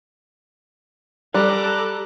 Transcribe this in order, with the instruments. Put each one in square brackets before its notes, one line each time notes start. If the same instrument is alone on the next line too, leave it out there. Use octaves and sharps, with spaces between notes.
[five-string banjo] G3 [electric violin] A4 [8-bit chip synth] A#5 D6 F#6